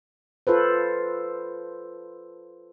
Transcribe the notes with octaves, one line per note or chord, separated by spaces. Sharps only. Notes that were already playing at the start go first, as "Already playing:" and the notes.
F4 A4 B4 C5